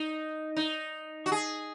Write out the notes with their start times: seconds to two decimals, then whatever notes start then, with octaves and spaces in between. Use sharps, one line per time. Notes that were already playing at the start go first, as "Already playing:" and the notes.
Already playing: D#4
0.56 D#4
1.26 F#4
1.32 G#4